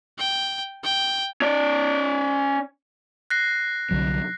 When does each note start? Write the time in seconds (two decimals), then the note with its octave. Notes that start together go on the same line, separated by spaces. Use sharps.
0.19 G5
0.84 G5
1.41 C#4 D5
3.30 F#6 A#6 C7
3.91 C2 D3 F#3